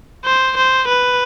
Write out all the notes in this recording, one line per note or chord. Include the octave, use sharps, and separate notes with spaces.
C5
C5
B4